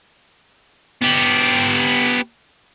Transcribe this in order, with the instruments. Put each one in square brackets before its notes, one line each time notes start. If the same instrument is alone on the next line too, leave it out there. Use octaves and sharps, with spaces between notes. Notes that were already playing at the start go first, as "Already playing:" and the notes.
[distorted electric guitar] B3 G4